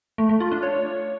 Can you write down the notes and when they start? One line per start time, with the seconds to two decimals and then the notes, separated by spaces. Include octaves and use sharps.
0.18 A3
0.29 A3
0.40 F4
0.51 D4
0.63 C#5